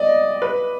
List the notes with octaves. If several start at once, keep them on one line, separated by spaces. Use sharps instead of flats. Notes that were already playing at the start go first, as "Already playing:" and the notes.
Already playing: D5 D#5
B4